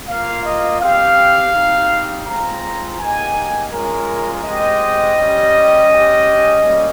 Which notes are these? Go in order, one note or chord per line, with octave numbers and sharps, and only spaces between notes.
A#3 F4 F5
D#5
C4 G4 F5
C4 D#4 G4
G#3 C4 F4 A#5
A#3 D#4 G4 G#5
G#3 C#4 F4 A#4
G#3 C4 G4 D#5
G3 C#4 G4
G#3 C#4 G4
G3 A#3 C#4